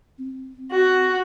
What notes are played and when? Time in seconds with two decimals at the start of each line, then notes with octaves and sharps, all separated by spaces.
0.18 C4
0.71 F#4